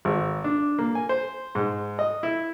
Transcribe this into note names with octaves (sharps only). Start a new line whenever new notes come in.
G#1
D4
A#3
G#5
C5
G#2
D#5
E4